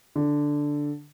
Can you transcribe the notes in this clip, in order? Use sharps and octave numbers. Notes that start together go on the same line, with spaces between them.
D3